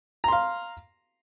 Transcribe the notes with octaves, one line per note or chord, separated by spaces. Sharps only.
F5 A#5 C6